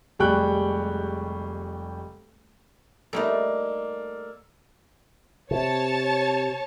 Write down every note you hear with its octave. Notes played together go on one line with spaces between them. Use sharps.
F1 G3 G#3 G5 C#6 F#6
G3 A3 A#3 D#4 A4
C3 C#5 A5